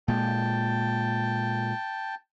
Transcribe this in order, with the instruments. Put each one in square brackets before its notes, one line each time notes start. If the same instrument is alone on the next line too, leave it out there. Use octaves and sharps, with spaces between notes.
[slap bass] A#2 G#3 [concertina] G5 A5